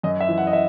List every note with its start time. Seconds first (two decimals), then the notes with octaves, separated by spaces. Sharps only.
0.03 F#2 D#5
0.20 E5
0.28 E3
0.38 F#5
0.47 D#5
0.53 E5